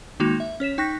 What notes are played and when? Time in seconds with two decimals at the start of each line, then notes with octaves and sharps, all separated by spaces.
0.20 D#3 G#3 A#3 D#4 F#4 F7
0.40 E5
0.60 C#4 C#5 B6 E7
0.78 D#4 G5 C#6 F#6 A#6 B6